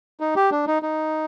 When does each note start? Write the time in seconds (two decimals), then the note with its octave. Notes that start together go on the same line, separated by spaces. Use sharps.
0.20 D#4
0.36 G4
0.51 D4
0.67 D#4
0.83 D#4